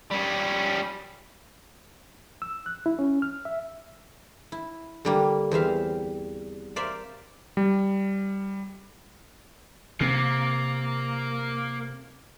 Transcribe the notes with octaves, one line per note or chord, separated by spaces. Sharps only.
G3 C#4
E6
F#6
E4
C#4
F6
E5
E4
D3 G3 A#3
E2 C4 E5 F5
A#4 C5 D5 E5 F5
G3
C3 A#3